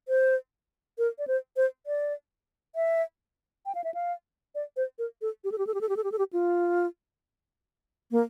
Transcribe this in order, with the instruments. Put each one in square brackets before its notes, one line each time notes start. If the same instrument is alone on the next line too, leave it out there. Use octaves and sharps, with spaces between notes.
[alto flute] C5
A#4
D5
C5
C5
D5
E5
G5
F5
E5
F5
D5
C5
A#4
A4
G4
A4
G4
A4
G4
A4
G4
A4
G4
A4
G4
F4
A#3